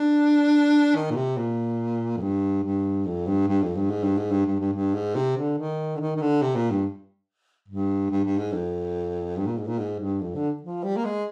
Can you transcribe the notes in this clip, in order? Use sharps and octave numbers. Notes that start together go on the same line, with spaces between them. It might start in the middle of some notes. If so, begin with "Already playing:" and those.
Already playing: D4
D#3
A#2
C3
A#2
F2
G2
G2
F2
G2
G2
F2
G2
G#2
G2
G#2
G2
G2
G2
G2
G#2
C3
D3
D#3
D3
D#3
D#3
D3
C3
A#2
G2
G2
G2
G2
G#2
F2
G2
A#2
G#2
A#2
G#2
G2
F2
D3
F3
G3
A#3
G#3